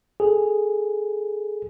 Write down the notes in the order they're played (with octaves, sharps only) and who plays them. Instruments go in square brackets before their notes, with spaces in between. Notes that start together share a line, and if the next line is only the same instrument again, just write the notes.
[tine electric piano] G#4 A4